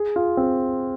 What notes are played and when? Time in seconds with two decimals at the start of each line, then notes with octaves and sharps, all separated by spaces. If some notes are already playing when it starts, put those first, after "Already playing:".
Already playing: G#4
0.16 F4
0.37 C4